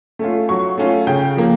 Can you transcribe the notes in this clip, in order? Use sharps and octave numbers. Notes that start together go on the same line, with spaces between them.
A3 C#4 F4
F#3 C#6
A3 C#4 F4
C#3 G5
F3 A#3